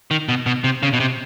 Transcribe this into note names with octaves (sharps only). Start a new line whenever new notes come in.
D#3
B2
B2
C3
C#3
B2
C3